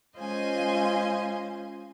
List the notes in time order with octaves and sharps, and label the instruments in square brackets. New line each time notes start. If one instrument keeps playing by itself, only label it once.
[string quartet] G#3 C#4 F4 C5 D#5 G#5